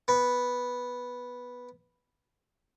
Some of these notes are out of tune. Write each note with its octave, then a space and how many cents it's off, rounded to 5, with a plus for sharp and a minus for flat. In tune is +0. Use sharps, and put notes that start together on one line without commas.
B3 -5